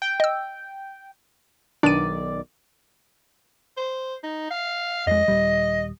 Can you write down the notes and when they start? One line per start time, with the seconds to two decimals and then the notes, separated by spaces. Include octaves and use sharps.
0.02 G5
0.20 D#5 E6
1.83 B1 D#3 D4 D5 D#7
3.77 C5
4.23 D#4
4.51 F5
5.07 F2 G#3 D#5
5.28 D#1 G3